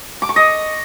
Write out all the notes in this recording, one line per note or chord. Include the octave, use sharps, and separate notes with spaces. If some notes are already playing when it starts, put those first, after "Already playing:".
D6
C#6
D#5